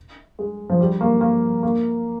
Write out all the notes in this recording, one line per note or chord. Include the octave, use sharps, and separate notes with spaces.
G#3
F3
G3
A#3
A#3
A#3